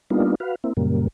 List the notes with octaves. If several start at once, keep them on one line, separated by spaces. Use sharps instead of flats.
G3 A#3 B3 D4 D#4 F4
F#4 B4 F5
A#3 C4 E4
F#2 A#2 C#3 G3 A#3